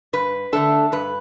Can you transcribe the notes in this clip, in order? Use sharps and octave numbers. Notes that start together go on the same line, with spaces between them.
G2 B4
D3 A3 D4 A4
G2 B4